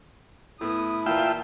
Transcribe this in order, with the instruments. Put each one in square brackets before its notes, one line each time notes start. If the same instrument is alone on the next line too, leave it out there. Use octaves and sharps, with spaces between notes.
[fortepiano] A2 B3 [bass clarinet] E4 [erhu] D#6
[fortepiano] A#2 E3 A#4 [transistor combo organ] F4 E5 G5 [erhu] A5